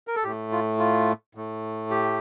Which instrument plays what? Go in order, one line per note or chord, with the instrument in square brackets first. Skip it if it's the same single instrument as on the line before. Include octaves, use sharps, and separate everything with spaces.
[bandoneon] A#4
A4
A2 A3 G4
F4
F4
A2 A3
G4